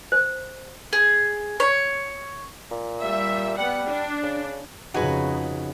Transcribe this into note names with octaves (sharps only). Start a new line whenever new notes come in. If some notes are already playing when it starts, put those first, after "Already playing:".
C5
G#4
C#5
A#2
G3 E5
G3 B3 F#5
D4
C#3
F2 C#3 D#4 F#4 G#4 B4